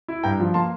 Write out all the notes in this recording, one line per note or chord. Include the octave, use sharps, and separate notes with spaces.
E4
G2 G5 A#5
F3
A#3 A5 C6